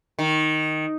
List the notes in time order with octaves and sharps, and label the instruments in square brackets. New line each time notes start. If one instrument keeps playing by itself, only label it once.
[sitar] D#3